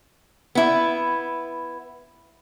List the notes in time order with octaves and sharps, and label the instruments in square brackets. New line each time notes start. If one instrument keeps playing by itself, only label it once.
[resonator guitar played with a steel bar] B3 E4